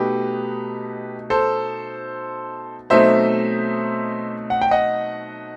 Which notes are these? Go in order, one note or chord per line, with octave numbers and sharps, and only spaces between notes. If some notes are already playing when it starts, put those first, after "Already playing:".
Already playing: B2 A3 D#4 G4 B4
A4 C5
B2 F#3 A3 C4 D#4 C5 E5
F#5
G5
D#5 F#5